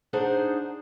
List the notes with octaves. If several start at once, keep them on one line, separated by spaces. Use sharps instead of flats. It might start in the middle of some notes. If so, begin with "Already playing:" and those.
D4 D#4 G#4 C5 F#5